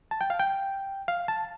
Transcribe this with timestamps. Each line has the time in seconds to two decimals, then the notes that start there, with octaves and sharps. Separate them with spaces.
0.11 A5
0.21 G5
0.30 F5
0.39 G5
1.08 F5
1.28 A5